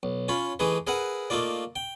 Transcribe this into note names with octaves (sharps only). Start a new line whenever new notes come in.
B1
C#4 F4 C#5 B5
E3 A3 D#4 G#4 B4
G#4 A#4 B4 E5 F#5
A3 A#3 D#4 F4 D5
G5